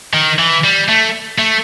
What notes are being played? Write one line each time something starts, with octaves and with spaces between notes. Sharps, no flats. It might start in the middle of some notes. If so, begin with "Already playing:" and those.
D#3
E3
G3
A3
A3